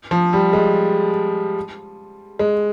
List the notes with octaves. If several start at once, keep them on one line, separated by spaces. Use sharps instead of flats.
F3
G3
G#3
G#3